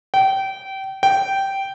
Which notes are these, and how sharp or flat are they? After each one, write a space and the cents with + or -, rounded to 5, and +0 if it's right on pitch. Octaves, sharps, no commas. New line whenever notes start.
G5 -25
G5 -10